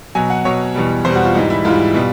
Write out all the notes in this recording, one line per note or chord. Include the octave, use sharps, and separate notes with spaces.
B2 F#3 G#5
F#5
B2 F#3 C#5
E2 B2 G3
E2 B2 G3 C5
F#4
F4
G#2 E3 G3 D#4
E4
G#2 E3 G3 F4
B2 G3